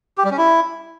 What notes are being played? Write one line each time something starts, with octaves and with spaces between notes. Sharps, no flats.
G4
G3
C#4
E4